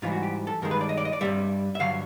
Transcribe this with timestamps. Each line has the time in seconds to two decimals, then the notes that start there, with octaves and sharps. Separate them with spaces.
0.02 G#2 E3 G3 F4
0.12 F#4
0.23 G4
0.47 A4
0.62 G2 D#3 G#3 A#4
0.71 B4
0.81 D5
0.89 D#5
0.97 D5
1.05 D#5
1.13 D5
1.21 G2 D#3 G3 E5
1.75 E5
1.79 G2 D3 F#3 F5